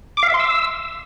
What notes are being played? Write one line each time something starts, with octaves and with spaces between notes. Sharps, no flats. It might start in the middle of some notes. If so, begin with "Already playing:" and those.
D6
F5
E5
C6
E6